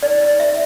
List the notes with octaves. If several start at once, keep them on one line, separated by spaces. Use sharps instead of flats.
D5
D5
E5